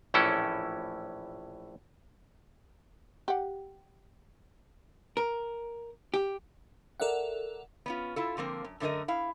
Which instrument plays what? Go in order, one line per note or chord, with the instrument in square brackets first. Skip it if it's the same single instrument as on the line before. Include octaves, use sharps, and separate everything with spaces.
[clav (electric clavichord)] A#1 A2 E3 C#4 E4 A4
[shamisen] G4 F#5
[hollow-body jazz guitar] A#4
G4
[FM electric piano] A4 A#4 D5 E5 F#5
[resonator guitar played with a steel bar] B3 C#4 F4
E4 F4 A4
D3 F3 A#3 C4
F#2
F#2 D3 A3 D4 A#4 D#5
E4 F5